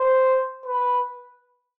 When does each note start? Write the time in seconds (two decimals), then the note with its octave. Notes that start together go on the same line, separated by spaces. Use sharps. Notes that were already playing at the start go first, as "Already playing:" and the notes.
Already playing: C5
0.66 B4